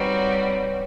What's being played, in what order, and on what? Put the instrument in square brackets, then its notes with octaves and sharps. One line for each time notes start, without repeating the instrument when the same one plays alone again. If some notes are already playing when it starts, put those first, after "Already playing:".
Already playing: [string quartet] G3 C4 D#4 F#4 [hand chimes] B4 C#5